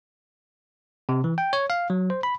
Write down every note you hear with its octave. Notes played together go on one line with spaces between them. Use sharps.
C3
E3
G5
C#5
F5
F#3
C5
B5